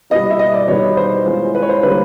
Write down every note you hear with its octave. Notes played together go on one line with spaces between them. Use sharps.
B2 G3 B3 E4 D#5
E5
D#5
D5
E2 B2 G3 B3 D#4 C#5
C5
E3 G#3 C#4 F4
B4
C#5
C5
D3 G3 A#3 C#4 B4